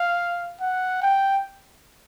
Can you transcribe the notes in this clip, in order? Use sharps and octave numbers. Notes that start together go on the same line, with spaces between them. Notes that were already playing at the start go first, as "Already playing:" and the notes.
Already playing: F5
F#5
G5